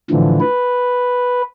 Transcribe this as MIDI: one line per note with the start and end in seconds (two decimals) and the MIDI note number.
0.10 0.40 45
0.10 0.40 50
0.10 0.40 52
0.10 0.40 53
0.40 1.42 71